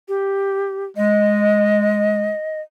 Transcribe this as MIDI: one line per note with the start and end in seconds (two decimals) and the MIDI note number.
0.08 0.85 67
0.97 2.31 56
0.97 2.61 75